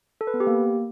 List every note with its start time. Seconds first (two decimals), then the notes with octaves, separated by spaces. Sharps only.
0.21 A4
0.27 B4
0.34 B3
0.40 G4
0.47 A#3